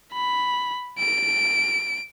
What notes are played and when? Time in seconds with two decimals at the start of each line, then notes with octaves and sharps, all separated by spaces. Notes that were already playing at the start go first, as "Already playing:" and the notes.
0.13 B5
0.99 D7